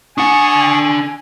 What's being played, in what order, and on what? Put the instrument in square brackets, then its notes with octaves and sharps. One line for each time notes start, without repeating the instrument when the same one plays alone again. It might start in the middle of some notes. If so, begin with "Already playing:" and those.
[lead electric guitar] D4 F#5 [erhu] G#5 [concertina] C#6 D#6